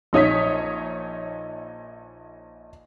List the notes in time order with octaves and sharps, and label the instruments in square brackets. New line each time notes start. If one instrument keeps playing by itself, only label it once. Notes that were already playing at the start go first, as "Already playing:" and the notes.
[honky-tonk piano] A#1 D#4 C#5 D#6 B6